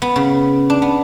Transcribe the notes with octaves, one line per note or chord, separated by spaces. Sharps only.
B3
C#3
D4
B3